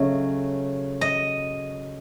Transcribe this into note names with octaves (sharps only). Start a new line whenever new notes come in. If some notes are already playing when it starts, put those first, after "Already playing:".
Already playing: C#3 F#3 A3 D#5
D#5